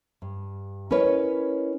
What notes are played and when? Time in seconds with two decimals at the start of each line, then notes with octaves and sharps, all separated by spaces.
0.22 G2
0.91 C#4 E4 A#4 B4 C#5 D#5